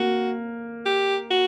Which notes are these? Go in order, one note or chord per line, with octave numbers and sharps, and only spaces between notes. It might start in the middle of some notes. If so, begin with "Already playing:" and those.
Already playing: A#3 F#4
G4
F#4